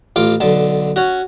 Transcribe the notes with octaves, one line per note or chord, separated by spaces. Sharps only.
A1 F4 D6
B1 D3 A5
C#4 F#4